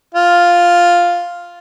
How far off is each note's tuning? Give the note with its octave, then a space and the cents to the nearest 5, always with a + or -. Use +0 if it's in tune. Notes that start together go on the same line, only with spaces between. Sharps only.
F4 +0 F5 +0